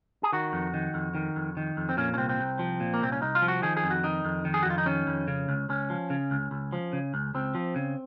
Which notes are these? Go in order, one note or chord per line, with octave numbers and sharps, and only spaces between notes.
G#4
D#3 F#4
F2
D#3
F2
D#3
F2
D#3
F2
C4
A#2 C#4
C#4
C2 C4
C4
C2
F3
A#2
A#3
C2 C4
C#4
C2 D#4
F4
F3
F#4
D#3 G#4
G#4
F2
F#4
D#3 D#4
F2
D#3
G#4
F#4
F2
F4
D#4
D#3 C#4
F2
C#3
C#2
C#2 C#4
F3
C#3
C#2
C#2
F3
C#3
C#2
C#2 C4
F3
C#3